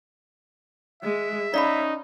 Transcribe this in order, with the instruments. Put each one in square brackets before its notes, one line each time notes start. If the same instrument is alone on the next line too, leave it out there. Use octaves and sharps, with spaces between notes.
[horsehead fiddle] G#3 [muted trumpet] E5
[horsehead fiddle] C#4 [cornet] D#4 [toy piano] D5 F5 B5